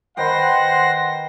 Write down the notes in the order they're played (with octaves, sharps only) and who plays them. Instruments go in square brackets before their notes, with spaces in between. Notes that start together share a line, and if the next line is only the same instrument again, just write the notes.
[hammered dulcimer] D#3 B4 G5 [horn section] C5 F#5 [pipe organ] C6 A#6